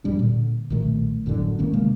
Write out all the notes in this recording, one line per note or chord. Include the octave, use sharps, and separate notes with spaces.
G1 F#2 G3 D4
A#2 D3
B1 A#2 D#3 A3
G1 F#2 A2 D3
G#1 D#3 A#3 C#4
C3 G#3 A#3